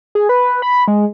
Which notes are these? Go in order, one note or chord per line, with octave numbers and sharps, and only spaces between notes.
G#4
B4
B5
G#3